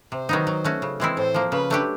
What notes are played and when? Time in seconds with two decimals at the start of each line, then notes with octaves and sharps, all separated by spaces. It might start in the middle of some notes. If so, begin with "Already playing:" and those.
0.12 C3 C5
0.29 D#3 F#3 B3 D#4
0.47 F#3
0.64 A3 C#4 F#4
0.82 C#3
1.00 E3 G#3 C4 E4
1.17 A2 C5
1.34 F3 A#3
1.52 C#3 B4
1.70 F#3 A3 D4 G4